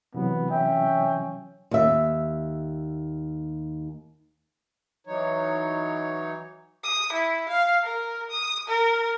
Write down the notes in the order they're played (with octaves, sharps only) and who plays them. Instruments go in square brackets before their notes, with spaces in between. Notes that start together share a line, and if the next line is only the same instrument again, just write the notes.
[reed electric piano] C3 E3 F#3 [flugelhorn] B3
[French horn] C#4 [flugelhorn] E5 [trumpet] G5
[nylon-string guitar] D#2 E5
[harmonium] E3 F#3 D#4 C#5
[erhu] D#6
E4
F5
A#4
D#6
A#4